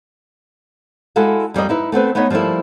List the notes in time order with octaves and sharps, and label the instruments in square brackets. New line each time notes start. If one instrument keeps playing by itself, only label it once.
[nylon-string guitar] G#3 E4 F#4 A4 F5
F2 G3 A#3 D#5
D#4 E4 B4
A3 B3 C4 B4
A3 B3 D#4 C#5 D#5
F3 G3 A3 A#3 E4